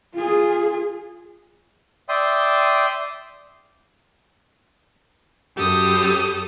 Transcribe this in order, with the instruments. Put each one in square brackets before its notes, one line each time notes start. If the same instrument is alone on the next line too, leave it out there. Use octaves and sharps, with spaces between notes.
[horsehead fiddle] F4 G#4
[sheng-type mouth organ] D5 E5 G5 C6 D#6
[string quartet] F#2 G4 A4 D#6